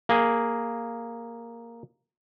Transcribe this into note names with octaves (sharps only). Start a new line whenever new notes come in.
A#3 G#4